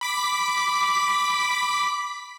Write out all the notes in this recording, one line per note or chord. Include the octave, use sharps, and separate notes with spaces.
B5 D6 B6